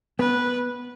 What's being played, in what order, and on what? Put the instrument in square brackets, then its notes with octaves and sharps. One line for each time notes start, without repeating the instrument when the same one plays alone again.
[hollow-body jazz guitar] B3 [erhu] B4